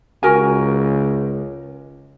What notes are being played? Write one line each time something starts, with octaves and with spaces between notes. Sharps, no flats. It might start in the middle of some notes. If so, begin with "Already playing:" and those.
C#2 F#4 A#4 G#5